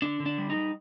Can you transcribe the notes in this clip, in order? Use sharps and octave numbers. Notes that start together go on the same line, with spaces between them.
D3 D4
D3
D4
G3
D#4
G3